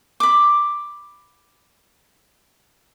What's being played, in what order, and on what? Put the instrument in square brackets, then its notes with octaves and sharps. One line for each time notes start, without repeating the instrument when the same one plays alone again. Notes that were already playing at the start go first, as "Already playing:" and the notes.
[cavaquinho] B5 D6